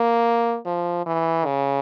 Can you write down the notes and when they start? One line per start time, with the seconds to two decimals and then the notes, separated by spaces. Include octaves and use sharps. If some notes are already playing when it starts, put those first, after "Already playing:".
Already playing: A#3
0.66 F3
1.06 E3
1.46 C#3